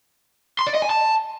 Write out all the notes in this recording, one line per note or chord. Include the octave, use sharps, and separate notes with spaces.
C6
D5
D#5
G#5
A5